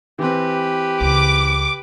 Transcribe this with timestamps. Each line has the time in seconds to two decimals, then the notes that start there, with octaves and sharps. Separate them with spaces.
0.19 E3 C4 G4 B4
1.01 C#2 D6